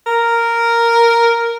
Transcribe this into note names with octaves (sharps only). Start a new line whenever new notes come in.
A#4